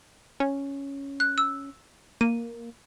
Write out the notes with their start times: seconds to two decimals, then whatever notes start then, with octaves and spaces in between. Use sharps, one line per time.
0.40 C#4
1.20 F#6
1.38 E6
2.21 A#3 D#7